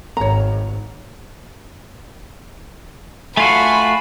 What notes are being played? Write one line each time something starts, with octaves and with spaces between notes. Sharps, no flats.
G#1 C#5 A#5
A3 F4 F#4 G#5 B5